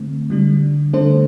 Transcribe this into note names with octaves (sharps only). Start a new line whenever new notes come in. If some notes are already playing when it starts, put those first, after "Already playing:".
Already playing: D3 A3 C4
D3 G3 D4
D3 A3 D4 A4 C5